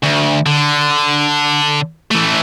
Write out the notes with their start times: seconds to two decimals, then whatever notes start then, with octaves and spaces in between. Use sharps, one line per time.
0.03 D2
0.46 D3
2.11 E3 A3